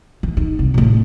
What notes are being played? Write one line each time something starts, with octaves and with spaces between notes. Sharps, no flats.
E3
D#4
C2
A2 A3